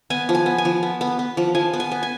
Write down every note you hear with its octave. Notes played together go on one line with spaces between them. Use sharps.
B3 G#5
F3
G#5
B3
G#5
F3
B3
B3
B3
F3
F3 G#5
B3
G#5
B3
G#5